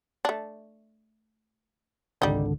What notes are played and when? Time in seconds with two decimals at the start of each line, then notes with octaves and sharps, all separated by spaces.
0.25 A3 D4
2.22 G#1 C#2 D3 G3 D#4